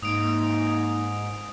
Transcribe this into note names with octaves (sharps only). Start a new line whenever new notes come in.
G#2 A#3 D#4 D#6 D7